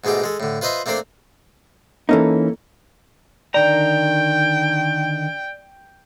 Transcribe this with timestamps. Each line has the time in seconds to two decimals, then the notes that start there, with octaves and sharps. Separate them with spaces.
0.04 G#2 B2 G#3 A3 G4
0.24 G#3 A4
0.40 A2 D3
0.61 F4 B4 C5 D#5 E5 C6
0.86 A3 A#3 C4 D4 A4 C5
2.09 E3 A#3 C#4 D#4 A4
3.54 D3 D#3 D5 G5 A#5